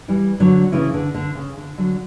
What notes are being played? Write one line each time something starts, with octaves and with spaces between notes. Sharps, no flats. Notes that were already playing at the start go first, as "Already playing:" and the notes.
E3 G3
D3 F#3
C#3 E3
D3
D3
C#3
D3
D3 F#3